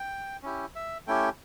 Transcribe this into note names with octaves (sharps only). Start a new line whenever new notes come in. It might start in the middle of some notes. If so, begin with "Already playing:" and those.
Already playing: G5
C#4 E4 G4
E5
A3 C#4 E4 G4 G5